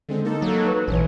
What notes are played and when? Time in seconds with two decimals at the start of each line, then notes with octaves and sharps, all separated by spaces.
0.09 D3 G#3 C4
0.25 A#3 D#4 A4
0.42 F#3
0.65 B4
0.88 A#1 E3 C#4 C#5